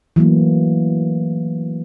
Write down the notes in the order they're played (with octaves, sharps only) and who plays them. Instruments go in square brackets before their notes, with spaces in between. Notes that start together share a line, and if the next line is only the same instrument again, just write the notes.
[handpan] E3 F#3 A3 A#3